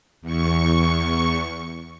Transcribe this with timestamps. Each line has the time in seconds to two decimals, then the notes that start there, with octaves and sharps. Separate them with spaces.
0.22 E2 C#6